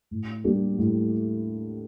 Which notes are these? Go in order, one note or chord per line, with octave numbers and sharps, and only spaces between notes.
A2
G3 A#3 D4 G4
A2